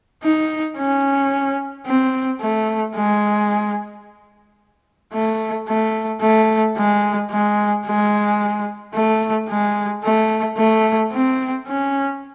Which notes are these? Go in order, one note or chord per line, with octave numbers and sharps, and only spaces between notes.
D#4
C#4
C4
A3
G#3
A3
A3
A3
G#3
G#3
G#3
A3
G#3
A3
A3
C4
C#4